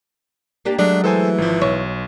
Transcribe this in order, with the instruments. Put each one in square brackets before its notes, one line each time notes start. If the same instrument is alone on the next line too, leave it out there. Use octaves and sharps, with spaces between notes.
[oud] A#3 D4 G4
[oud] F#3 G#3 A3 [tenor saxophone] D4
[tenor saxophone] E3 [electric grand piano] A4 C5 G#5
[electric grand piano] G#1 F3
[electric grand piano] B1 [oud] C#5